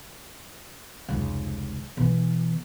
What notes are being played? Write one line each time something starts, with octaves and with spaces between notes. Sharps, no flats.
F1 C#2
B2 E3